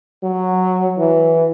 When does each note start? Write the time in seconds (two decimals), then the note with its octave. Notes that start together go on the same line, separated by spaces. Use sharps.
0.23 F#3
0.98 E3